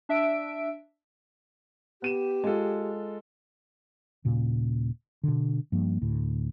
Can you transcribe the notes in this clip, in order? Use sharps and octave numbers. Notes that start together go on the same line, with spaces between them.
D4 E5 E6 D7
B3 G4 D#7 E7
G#3 F4 A4
D#1 A#2 C#3
B2 D3
G2 F3 A#3
D2 A2